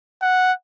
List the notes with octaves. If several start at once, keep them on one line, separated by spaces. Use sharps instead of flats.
F#5